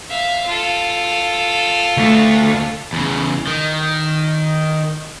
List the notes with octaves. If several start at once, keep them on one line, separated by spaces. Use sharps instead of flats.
E5 F5
F4 A4
D2 A3
E2 C#3
D#3